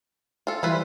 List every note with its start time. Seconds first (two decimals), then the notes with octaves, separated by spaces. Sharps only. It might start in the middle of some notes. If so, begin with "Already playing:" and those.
0.47 F4 A4
0.63 E3 G3 E4 F4 B4 C5